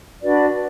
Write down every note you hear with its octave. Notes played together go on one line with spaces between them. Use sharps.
D4 F#4 B4 D5